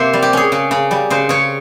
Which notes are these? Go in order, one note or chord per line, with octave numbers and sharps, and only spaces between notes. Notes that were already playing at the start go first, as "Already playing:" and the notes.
Already playing: C3 A#3 C5
G3
G4
C#4 G#4
C#3
C#3
G3
C#3 C5
C#3 C#5